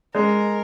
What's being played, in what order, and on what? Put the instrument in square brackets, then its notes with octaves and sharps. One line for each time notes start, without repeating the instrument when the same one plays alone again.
[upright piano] G#3 [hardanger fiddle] A#4